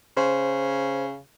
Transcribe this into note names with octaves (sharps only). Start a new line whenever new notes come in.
C#3 C5